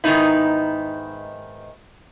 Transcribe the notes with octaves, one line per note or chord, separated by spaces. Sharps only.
G#2 D#3 F3 B3 D#4 E4